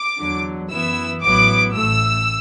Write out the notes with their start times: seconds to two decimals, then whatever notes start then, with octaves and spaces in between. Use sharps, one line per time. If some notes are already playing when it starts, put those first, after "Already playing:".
Already playing: D6
0.19 E2 D3 F#3
0.71 F#2 E3 B3 E4 E6
1.23 A1 A2 F#3 B3 E4 D6
1.74 A1 A2 A3 E6